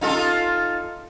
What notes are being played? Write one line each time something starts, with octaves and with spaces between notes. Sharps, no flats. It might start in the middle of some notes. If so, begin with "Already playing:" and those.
D#4 F4 A4